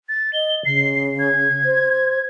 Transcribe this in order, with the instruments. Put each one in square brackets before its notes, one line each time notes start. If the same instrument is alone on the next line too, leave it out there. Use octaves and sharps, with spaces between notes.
[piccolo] A6
[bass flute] D#5 [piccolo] G7
[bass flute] C#3 [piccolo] C7
[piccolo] G#6
[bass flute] C5